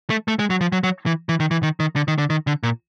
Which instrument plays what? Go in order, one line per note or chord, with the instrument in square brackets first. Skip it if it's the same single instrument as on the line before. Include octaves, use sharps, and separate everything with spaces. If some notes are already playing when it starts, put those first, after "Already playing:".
[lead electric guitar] A3
A3
G#3
F#3
F3
F#3
F#3
E3
E3
D#3
E3
D#3
D#3
D3
D#3
D3
D#3
D3
A#2